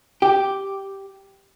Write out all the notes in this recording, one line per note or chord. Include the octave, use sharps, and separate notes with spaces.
G4